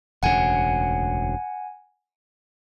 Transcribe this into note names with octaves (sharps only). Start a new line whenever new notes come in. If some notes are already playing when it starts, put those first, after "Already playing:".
E1 D2 C#3 F#5 G#5